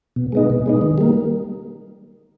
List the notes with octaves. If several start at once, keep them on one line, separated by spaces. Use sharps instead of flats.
B2
G#3 B3 D#4
B2
G#3 B3 D#4
D#3
G3 A#3